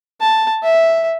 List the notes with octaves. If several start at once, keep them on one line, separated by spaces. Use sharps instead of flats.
A5
E5